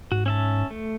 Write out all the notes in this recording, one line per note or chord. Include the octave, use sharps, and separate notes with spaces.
G#2 F#4
C#4 E5 A5
A3